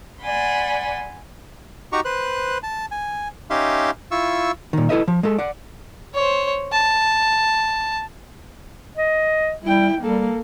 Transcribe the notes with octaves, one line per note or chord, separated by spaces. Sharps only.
D5 F#5 G#5 B5 C6
D#4 F#4 G4 A#5 C#6
B4 C5 F#6
A5
G#5
C#4 D#4 G4 E5 F5 C6
E4 F4 C#6 E6
A#2 D#3
E4 A4 B4 D#5 E5
F3
G#3 A4
D5 F#5
C5 C#5
A5
D#5
G3 E4 G5
G3 A#3 A4